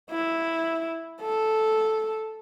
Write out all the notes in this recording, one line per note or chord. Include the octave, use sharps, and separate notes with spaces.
E4
A4